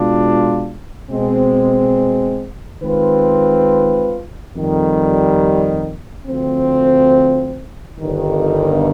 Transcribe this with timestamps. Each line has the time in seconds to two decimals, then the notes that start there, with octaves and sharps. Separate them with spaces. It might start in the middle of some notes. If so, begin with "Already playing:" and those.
Already playing: B2 G#3 D4 F4
1.10 B2 G#3 C4
2.82 D#3 G#3 C4 F4 B4
4.55 F2 D#3 G3
6.27 D2 D3 F3 C4
7.99 G1 G2 D#3